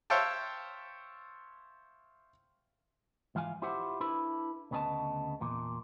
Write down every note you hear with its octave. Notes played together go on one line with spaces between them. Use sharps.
C5 C#5 E5 F5 G5 A5
G#2 E3 F4 F5 G#5
E4 F4 G4 C5 E5 F#5
D4 E4 A4 B4 E5 B5
D2 C#3 B3 G#4 D#5 A5
E2 A#2